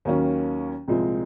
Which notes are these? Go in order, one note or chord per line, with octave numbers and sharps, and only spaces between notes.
D#2 D#3 F#3 A#3 C#4
C2 A#2 F3 G#3 C4